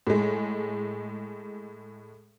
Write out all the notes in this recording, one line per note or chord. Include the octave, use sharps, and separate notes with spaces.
A2 G#3